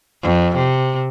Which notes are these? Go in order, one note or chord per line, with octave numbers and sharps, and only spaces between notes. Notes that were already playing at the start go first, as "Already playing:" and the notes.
F2
C3